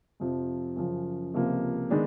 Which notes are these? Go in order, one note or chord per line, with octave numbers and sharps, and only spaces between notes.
F2 C3 F3
F#2 C#3 F3
C#2 C3 F3 A#3
D#3 G#3 B3 D4